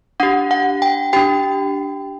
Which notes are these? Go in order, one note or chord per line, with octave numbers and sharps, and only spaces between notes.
D4 G4 F#5
F#5
G5
D4 G4 G5